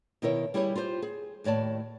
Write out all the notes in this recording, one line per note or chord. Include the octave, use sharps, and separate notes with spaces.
B2 D#3 E4 A#4 C#5
G3 E4 G4 G#4 C#5
F4 G4 A4 C5
G#4
D#2 A2 C#5 D5 A5